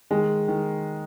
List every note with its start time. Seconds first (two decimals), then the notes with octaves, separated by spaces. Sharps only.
0.11 D#3 G#3
0.48 D#3